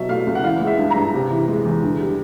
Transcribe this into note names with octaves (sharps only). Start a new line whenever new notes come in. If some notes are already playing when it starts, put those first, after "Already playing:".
Already playing: B2 F#3 E5
A3 F5
C#2
F#5
E3 F5
G#3
E5
G2
A#5
G2
C3
E3
G#3
E2
D3
G3